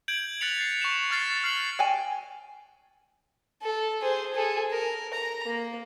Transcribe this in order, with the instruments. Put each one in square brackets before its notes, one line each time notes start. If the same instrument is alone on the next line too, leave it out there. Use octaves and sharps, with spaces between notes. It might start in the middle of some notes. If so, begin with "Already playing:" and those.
[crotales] G6 G#6 D7 F#7
F#6 A6 B6 C#7 F7 F#7
A6 C7
C#6 E7
C#6 F6 A6 C7
F6 C7 F#7
[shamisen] F5 G5 G#5
[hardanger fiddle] A4
G#4 C5
G#4 A4
A#4
A#5
A#3